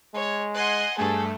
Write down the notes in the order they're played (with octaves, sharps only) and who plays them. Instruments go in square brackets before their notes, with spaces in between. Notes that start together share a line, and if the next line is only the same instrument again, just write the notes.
[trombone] G#3 [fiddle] C#5
[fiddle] D#5 F#5 [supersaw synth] G#5 C6 F#6
[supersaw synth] G2 A3 [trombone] G#4 [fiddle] A4